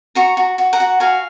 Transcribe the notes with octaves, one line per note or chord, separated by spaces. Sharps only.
F#4 A#5 C#6
F#4
F#4
F#5 A#5
F#4
F#4 F5 G#5